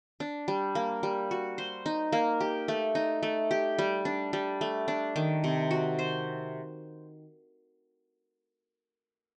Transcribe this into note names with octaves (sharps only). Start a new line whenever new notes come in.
D4
G3
A#3
G3
F#4
C5
D#4
A#3
G4
A3
D#4
A3
G4
G3
D4
G3
A3
D4
D#3
C3
F#4
C5